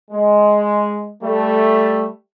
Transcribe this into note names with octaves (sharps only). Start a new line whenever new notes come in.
G#3
G3 A3